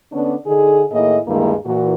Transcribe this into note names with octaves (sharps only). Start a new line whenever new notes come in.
D3 B3 C#4 D4
D3 D#4 G#4
A2 D#3 A#3 E4 G#4 D#5
D2 G2 D#3 G#3 A#3 E4
A#2 E3 F#4